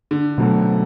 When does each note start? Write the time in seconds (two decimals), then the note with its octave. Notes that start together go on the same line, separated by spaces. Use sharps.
0.11 D3
0.38 B2 F#3 A3